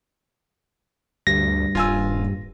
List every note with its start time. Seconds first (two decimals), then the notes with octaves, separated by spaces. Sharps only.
1.27 D2 G2 A#6
1.75 D#1 F4 G#5 E6